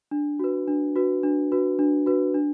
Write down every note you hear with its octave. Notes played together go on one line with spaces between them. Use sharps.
D4
F#4 B4
D4
F#4 B4
D4
F#4 B4
D4
F#4 B4
D4